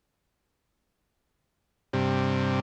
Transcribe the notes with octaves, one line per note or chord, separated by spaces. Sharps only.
G2 C3